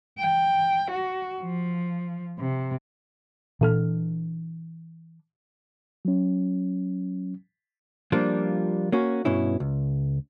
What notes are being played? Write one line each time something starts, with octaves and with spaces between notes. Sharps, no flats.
G5
F#4
F3
C3
A#2 E3 D4 A4 F6
F#3 C#4
F3 G3 A#3 D4 F4
A#3 C#4 F#4
G2 B2 C#4 E4
C#2